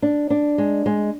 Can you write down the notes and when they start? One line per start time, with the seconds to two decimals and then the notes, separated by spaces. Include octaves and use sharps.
0.02 D4
0.30 D4
0.58 G#3
0.86 G#3